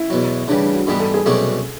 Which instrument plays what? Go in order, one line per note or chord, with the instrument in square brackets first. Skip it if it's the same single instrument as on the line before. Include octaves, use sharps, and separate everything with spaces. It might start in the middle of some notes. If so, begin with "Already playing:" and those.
Already playing: [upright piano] E4
[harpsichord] E2 B2 F#3
[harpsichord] C#3 E3 G3 [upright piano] D4
[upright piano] D4
F#4
[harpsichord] G#2 E3 G3 B3 [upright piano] G#4
[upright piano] A4
G#4
[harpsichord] C2 B2 F#3 A3 D4 [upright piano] G#4